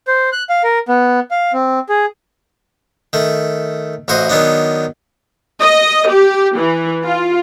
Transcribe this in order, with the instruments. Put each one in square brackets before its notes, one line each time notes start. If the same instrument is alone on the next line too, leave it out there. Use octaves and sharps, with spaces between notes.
[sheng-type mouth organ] C5
F#6
F5
A#4
B3
F5
C4
G#4
[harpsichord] D#3 A3
A1 E3 F#4 C5 D#5
D#3 F#3 B3 D4 D#4
[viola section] D#5
G4
E3
F4